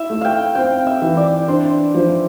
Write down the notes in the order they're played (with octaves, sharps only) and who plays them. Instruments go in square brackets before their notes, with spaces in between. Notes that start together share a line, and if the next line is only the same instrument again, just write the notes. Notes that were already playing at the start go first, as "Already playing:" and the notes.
Already playing: [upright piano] E4 [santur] E5
[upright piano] A3
[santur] F5 G5
[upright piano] C4 [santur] G5
[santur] E5
[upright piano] E3
[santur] D5
[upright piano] D4 [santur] C5
[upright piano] F3